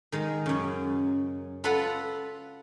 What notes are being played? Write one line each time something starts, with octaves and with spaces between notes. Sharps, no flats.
D#3 G#3
F#2 C#3
F4 A4 B4 F5 F#5